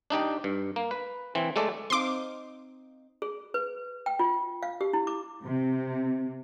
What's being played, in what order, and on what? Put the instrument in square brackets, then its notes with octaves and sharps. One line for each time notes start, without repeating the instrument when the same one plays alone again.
[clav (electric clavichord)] D4 D#4 G4 G5
G2
A#3
B4
E3 C4
G#3 A3 A4 D5
[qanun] C4 D#4 F5 [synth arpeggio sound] C6 D6
[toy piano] G#4
B4
G5
F4
F5
G4
E4
D6
[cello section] C3